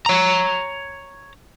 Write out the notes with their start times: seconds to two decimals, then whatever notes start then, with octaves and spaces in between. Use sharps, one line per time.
0.06 C#5 A#5